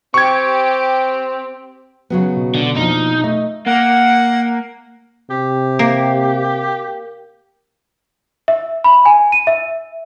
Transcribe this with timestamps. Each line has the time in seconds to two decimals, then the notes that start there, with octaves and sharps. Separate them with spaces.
0.14 C4 G4 C#6 G#6
2.10 C#3 F#3 B3
2.37 B2
2.55 D3
2.76 F3 A#3 D4 D#4
3.24 A3 D#5
3.67 A#3 F#5
5.30 C3 G4
5.79 A#3
8.48 E5
8.84 B5
9.05 G#5
9.32 D#7
9.47 E5